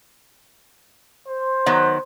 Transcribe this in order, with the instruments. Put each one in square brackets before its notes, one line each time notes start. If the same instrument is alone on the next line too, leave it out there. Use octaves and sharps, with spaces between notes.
[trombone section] C5
[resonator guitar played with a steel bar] D#3 F#3 B3